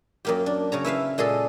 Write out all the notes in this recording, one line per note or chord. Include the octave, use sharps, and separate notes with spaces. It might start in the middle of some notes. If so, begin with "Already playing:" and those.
F#2 A#3 G4
D4
C#3 C#5 A#5
E4 B4 E5 F5
A#2 G#3 G#4 A4